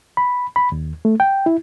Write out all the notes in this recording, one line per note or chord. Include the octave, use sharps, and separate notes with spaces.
B5
B5
D#2
A3
G5
E4